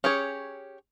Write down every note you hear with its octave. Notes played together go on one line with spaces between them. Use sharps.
C#4 G4 G#4 C#5